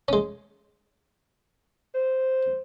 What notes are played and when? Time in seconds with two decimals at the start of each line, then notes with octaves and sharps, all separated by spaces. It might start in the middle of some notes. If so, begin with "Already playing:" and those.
0.08 G#3 C#4
1.95 C5